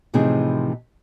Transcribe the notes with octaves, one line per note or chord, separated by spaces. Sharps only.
A2 C3 E3 F3 D#4 G#4